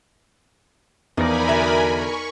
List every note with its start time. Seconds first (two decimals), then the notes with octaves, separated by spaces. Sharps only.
1.17 E2 F3 D#4 A#4 D5 G#5 B5 A#6
1.48 D3 F#4 E5
1.92 C#6